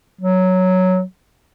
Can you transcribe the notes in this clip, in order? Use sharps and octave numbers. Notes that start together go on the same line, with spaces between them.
F#3